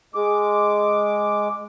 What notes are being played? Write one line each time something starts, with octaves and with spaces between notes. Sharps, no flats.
G#3 D6